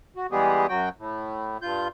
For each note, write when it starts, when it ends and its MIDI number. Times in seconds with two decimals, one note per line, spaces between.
0.16 0.27 66
0.31 0.67 52
0.31 0.67 55
0.31 0.67 56
0.31 0.67 59
0.31 0.67 67
0.31 0.67 68
0.69 0.89 42
0.69 0.89 54
0.69 0.89 66
0.69 0.89 79
0.98 1.58 45
1.62 1.88 43
1.62 1.88 65
1.62 1.88 91